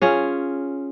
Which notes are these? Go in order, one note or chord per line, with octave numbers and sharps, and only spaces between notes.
C#4 F4 G#4